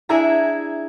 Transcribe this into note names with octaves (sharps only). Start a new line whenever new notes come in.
D4 E4 G#4 E5 G#5 A#5